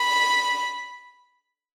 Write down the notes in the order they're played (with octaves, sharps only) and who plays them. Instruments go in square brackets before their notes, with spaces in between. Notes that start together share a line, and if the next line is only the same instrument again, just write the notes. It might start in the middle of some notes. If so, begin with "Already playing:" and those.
Already playing: [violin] B5